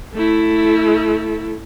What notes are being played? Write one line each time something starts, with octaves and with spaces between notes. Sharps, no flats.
A3 E4